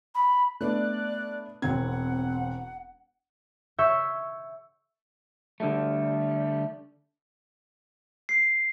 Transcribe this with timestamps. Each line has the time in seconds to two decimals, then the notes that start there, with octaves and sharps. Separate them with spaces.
0.14 B5
0.61 A3 B3 D4 D5 F#6
1.62 E1 C4 F#5 G#6
3.78 E5 C#6 E6 G6 G#6 B6
5.60 D3 G3 A3
8.29 C7